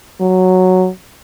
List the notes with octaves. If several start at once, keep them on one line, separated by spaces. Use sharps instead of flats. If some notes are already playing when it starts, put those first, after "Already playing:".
F#3